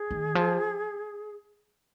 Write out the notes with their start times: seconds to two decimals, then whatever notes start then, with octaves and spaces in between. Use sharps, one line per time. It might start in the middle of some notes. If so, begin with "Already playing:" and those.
Already playing: G#4
0.11 D#3
0.35 F3